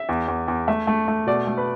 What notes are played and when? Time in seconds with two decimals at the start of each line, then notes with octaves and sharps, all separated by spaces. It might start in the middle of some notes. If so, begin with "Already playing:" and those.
Already playing: E5
0.09 E2
0.28 E2
0.48 E2
0.68 A3 E5
0.87 A3
1.08 A3
1.27 B2 D5
1.47 A3
1.58 B4